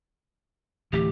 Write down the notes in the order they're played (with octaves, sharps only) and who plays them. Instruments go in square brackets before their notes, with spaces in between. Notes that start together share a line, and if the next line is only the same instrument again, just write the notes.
[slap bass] D1 E3 A3 [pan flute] G4